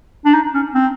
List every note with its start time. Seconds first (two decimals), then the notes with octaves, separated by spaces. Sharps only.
0.25 D4
0.34 D#4
0.54 C#4
0.74 C4